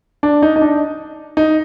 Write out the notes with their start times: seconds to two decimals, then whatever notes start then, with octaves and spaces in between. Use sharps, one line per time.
0.23 D4
0.42 D#4
0.56 D#4
0.62 D4
1.37 D#4